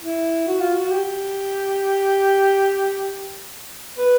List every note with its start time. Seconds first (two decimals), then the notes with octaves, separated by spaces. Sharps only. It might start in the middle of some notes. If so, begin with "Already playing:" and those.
0.04 E4
0.48 F#4
0.61 F4
0.73 F#4
0.91 G4
3.98 B4